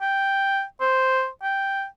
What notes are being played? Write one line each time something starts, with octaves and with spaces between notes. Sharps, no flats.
G5
C5
G5